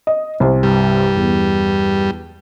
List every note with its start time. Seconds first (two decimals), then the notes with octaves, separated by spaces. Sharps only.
0.07 D#5
0.40 C2 C5
0.63 G2 G3
1.16 E2